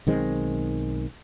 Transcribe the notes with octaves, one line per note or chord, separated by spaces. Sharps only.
B1 D#3 G#3 C4